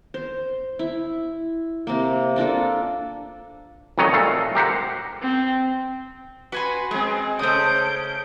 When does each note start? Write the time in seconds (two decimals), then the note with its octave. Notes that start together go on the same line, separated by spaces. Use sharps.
0.14 C5
0.79 E4
1.87 C3 A#3
2.36 A#3 D4 F4 A4
3.98 F2 D#3 F#3 C#5 D#5
4.13 A#2 A3 A4 F5
4.55 G4 A#4 C5 F#5
5.21 C4
6.52 F#4 B4 G#5 C6
6.91 G#3 C4 G#4
7.39 C#3 A3 C5 D#6 G6 D7